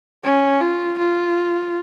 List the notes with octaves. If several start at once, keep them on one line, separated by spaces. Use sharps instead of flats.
C#4
F4
F4